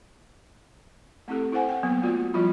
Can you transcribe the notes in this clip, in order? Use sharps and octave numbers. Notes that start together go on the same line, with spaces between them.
A3 C4 E4 G4 A4
E4 A4 C5 F#5 G#5
G5
F#3 A#3 B3
A3 A#3 F4 F#4 D5
F3 G3 E4 F4 B5